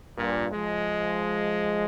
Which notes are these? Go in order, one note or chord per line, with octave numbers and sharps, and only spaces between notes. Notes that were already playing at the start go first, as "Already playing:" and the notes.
G2 A#2
F3 G#3